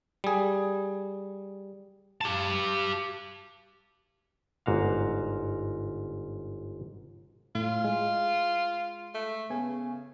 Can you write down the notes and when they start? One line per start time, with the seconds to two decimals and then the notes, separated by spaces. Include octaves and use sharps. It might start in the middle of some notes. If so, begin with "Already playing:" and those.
0.24 G3 G#4
2.21 G4 A5
4.66 G1 G#2 F#4 F5
7.55 A2 F4
7.84 G#3
9.15 A3
9.50 C#3 B3 G#5